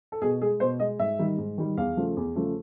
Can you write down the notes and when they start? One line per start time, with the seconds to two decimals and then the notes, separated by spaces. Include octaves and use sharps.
0.12 A4
0.22 B2 G#4
0.41 G#3 G#4
0.60 B2 C5
0.79 G#3 D#5
0.99 G#2 E5
1.19 D#3 G3
1.38 G#2
1.58 D#3 G3
1.77 E2 F5
1.97 C#3 F3 A3
2.16 E2
2.36 C#3 F3 A3